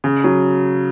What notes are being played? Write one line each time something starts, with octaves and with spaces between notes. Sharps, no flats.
C#3
F#3